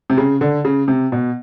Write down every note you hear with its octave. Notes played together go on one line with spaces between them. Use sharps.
C3
C#3
D3
C#3
C3
B2